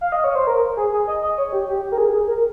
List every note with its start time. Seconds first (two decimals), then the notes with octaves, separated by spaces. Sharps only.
0.01 F5
0.12 D#5
0.24 C#5
0.35 C5
0.47 A#4
0.77 G#4
0.93 G#4
1.08 D#5
1.23 D#5
1.38 C#5
1.53 G4
1.69 G4
1.83 G4
1.92 A#4
1.98 G#4
2.14 G#4
2.28 A#4